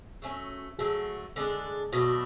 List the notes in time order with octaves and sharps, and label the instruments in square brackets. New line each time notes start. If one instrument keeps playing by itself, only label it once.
[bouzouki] F#3 A3 C#4
[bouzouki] D3 F#3 A3 [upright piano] G#4
[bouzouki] D3 G#3 D4
[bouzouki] B2 F#3 A3 D4 [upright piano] F#4